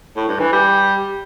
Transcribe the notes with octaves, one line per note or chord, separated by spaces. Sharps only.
A2
G2
E3
G3